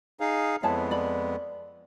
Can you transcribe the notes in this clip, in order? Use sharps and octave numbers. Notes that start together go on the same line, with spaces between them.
D#4 G#4 F5
F2 G#3 B3 E4 C#5 A5
D5 B5